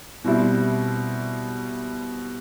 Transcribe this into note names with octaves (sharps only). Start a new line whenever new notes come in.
B2 G3 C4 E4